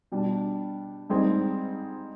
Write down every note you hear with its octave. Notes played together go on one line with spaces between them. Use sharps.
B2 G3 D4
G#2 G3 C4 D#4 G#4